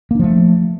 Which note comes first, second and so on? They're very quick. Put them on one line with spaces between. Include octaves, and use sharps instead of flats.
A#3 D4 F3 A3